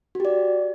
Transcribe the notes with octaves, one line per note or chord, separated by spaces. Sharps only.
F#4 G4 D5